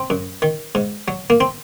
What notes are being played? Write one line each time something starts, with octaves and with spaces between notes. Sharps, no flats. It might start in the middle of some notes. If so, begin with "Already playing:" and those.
Already playing: C4
F#2
D#3
G#2
F#3
A#3
C4